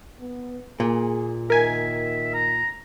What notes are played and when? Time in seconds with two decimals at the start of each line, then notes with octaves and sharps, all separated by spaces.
0.19 B3
0.80 A#2 G#4
1.50 D#3 A#4 E5 G#5
2.34 A#5